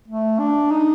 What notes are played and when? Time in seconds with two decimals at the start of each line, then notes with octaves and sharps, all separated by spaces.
0.08 A3
0.39 D4
0.71 D#4